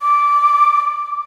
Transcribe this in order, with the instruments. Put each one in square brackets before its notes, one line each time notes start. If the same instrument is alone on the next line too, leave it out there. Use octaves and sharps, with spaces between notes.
[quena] D6